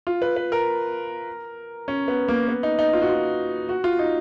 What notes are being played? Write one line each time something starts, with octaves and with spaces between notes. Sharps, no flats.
F4
B4
B4
A#4
C#4
B3
A#3
B3
D#4
D#4
F4
F#4
F4
F#4
F4
D#4